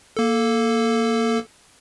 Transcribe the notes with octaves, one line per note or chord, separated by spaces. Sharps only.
A#3 A4